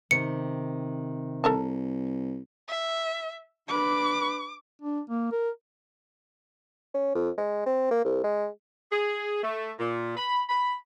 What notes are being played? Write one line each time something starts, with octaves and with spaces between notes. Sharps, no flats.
C3 D#3 C#7
C2 A4 A#4 A5
E5
D4 B4 D6
D4
A#3
A#4
C#4
F2
G#3
C4
A#3
C2
G#3
G#4
A3
A#2
B5
B5